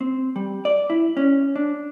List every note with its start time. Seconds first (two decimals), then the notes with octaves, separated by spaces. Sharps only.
0.01 C4
0.36 G3
0.65 D5
0.90 E4
1.17 C#4
1.56 D4